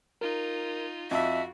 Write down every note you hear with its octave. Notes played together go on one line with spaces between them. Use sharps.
D#4 F4 A#4
F2 F#4 D#5 E5 A5 E6